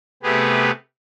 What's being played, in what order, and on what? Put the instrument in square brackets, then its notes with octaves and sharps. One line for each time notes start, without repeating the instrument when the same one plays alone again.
[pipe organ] C3 A3 B3 G4 G#4 B4